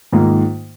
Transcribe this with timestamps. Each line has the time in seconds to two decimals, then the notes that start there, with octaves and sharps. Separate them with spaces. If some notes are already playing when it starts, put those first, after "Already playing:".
0.12 G#2 D#3 A#3 F4